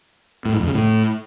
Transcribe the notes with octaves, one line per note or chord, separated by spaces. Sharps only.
A2
G#2
F2
C#3
A2